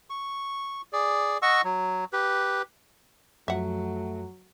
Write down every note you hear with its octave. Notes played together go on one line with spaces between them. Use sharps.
C#6
G#4 D5
D#5 F#5 C#6 E6
F#3
G4 B4
F#2 F3 F#3 A3 E5 F#5